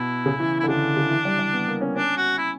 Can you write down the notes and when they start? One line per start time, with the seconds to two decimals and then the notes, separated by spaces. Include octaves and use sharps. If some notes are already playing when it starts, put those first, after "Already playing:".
Already playing: B2 E4
0.26 C#3
0.40 E3
0.60 E4
0.64 D3
0.68 C#3 D4
0.97 C#3
1.10 E3
1.25 G3
1.39 G3
1.53 B3
1.68 A#3
1.81 C#4
1.95 C#4 D4
2.17 F#4
2.38 E4